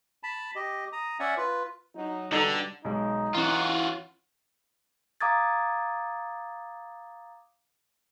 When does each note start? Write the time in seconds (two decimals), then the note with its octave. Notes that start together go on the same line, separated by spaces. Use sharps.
0.23 A5 B5
0.55 G4 D#5
0.92 A#5 D#6
1.20 C#4 D5 E5 F#5 G#5
1.37 F4 B4
1.95 F#3 D#4
2.32 B2 D3 G3 D#4 A4 A#5
2.85 B1 G#3 D#4
3.34 E3 C#4 F4 F#4
5.21 F5 A#5 D6 D#6 G#6 A6